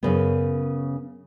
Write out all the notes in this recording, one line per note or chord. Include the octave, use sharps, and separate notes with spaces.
F#2 C#3 B3